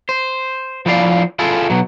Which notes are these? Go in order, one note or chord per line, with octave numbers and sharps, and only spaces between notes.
C5
F3 E4 D5 F5
E4 F4 G#4 A4
B2 F#3